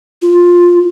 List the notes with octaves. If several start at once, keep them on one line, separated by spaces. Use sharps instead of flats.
F4